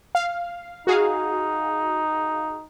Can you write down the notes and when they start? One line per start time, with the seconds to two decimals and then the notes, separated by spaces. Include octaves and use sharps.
0.15 F5
0.87 D#4 F#4 G#4 F5